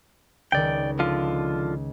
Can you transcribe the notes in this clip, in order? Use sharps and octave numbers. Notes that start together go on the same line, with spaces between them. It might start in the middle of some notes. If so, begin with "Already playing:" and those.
C#2 D#3 D5 G5
D3 F3 F4